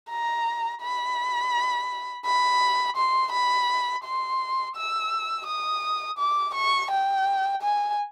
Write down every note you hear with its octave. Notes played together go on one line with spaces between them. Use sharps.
A#5
B5
B5
C6
B5
C6
E6
D#6
D6
C#6
G5
G#5